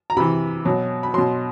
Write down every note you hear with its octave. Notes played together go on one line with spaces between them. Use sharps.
A#5
C3 E3 B5
B2 F#3
B5
B2 F#3 C6